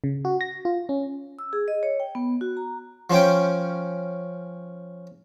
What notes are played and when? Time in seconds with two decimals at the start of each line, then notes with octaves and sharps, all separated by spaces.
0.04 C#3
0.25 F#4
0.41 A#6
0.65 F4
0.89 C#4
1.39 E6
1.53 G#4
1.68 D#5
1.83 C#5
2.00 G5
2.15 B3
2.41 F#4
2.57 A#5
3.10 F3 C#4 G5